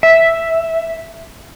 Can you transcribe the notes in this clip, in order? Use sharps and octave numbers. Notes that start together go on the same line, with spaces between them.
E5